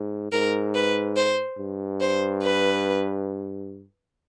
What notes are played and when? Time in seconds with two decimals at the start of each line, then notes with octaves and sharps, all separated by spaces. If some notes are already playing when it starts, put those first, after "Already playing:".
Already playing: G#2
0.32 G#2 A#4
0.75 B4
1.16 C5
1.58 G2
2.01 C5
2.43 B4